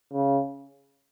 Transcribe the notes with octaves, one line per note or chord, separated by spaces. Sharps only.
C#3